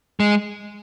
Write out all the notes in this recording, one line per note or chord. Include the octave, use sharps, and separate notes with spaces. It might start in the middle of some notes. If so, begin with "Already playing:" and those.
G#3